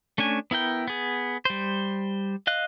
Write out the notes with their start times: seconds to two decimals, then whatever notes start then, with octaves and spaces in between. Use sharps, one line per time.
0.18 A3 C#4 D4 G#5
0.51 B3 E4 A#4 G5
0.88 B3 G#4
1.45 G3 C5
2.47 D#5 F5 F#6